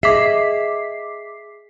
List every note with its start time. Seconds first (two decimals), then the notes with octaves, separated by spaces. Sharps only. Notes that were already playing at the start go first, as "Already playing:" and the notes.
0.03 G#4 D#5 E5 D6 B6 C7